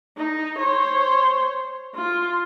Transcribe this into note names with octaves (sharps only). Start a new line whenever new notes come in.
D#4
C5 C#5
F4